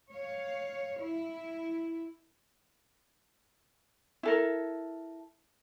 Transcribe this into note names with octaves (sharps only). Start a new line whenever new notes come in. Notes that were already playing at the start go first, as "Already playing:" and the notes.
C#5 F5
E4
E4 A4 A#4